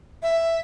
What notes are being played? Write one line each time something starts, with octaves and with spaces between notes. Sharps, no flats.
E5